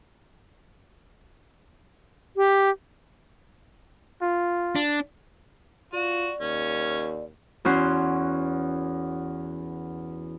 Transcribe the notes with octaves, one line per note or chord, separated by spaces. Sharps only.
G4
F4
D4
F4 F#4 D5
D#2 C#4
E2 C#4 F#4 C6 G6